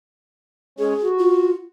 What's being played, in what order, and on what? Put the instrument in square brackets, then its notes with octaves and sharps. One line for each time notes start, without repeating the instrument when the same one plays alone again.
[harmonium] G#3 C#4 C#5 [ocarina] G#4
[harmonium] F#4
[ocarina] F4